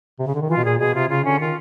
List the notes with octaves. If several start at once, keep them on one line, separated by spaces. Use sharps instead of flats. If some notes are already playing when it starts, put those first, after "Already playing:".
C3
C#3
D3
D#3
E3 F4
B2
A#2 G#4
B2 G#4
C3 F4
C#3 F4
D3 C#4
D#3 F4